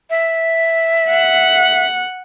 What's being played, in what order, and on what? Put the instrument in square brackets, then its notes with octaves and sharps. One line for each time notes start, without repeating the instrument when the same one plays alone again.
[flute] E5
[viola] F#5